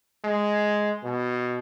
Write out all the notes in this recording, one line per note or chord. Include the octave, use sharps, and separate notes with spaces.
G#3
B2